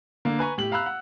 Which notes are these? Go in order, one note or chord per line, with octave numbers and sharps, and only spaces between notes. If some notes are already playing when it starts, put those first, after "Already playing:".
D3 A#3
B4 G#5 A#5 C#6
A2 G4 F#7
F5 A#5 B5 E6 F#6
F#5